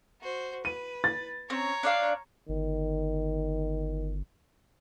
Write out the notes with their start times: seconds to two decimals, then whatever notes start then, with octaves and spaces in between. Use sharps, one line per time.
0.21 F#4 C5
0.65 B4 D#7
1.04 A6
1.50 C4 C#4 C#5 A#5
1.83 D4 D5 F5
2.49 G1 D#3